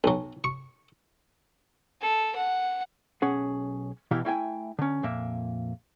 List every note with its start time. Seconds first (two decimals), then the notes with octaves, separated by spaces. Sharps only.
0.04 B1 F#3
0.44 C#6
2.01 A4
2.36 F#5
3.22 B1 C#4 G#4 F#5
4.11 B2 E3 E4 G4 F5 A#5
4.25 A3 E4 G5 G#5
4.79 D3 C#4
5.03 F2 A#2 A#3 E5